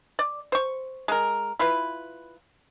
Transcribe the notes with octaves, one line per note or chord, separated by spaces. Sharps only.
D5
C5 C#6
G#3 A#4
E4 F4 B4